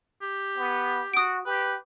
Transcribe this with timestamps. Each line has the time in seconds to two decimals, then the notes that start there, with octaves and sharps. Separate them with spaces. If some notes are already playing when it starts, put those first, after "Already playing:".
0.22 G4
0.58 B3
1.14 F#4 D#6 D7
1.46 G4 B4